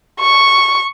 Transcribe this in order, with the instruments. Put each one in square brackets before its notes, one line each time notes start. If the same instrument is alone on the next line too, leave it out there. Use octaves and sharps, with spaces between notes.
[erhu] C#6